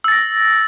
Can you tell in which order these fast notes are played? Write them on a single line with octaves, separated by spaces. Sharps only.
E6 A6 A#6